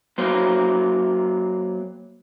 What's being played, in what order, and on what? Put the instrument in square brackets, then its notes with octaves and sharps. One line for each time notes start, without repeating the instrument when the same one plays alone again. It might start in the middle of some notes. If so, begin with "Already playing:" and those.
[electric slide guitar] F#3 A#3 C5